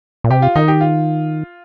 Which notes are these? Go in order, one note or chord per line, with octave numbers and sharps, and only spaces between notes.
A#2
C3 G4
F4
D#3 D#4
G4
F4